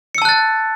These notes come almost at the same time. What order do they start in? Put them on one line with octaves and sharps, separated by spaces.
C#7 E6 A5 F#6 A6